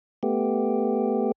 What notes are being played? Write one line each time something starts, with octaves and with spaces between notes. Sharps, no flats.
A3 B3 G4